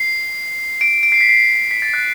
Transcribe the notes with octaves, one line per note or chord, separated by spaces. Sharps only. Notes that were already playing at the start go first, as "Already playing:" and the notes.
Already playing: C7
D7
D7
C7
B6
C7
B6
A6
F#6